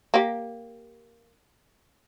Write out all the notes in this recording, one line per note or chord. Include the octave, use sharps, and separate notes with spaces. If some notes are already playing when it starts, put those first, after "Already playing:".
A#3 G4